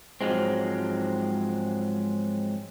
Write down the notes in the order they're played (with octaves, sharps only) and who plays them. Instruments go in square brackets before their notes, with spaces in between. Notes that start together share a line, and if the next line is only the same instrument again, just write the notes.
[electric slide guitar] G#2 F3 F#3 G#3 C4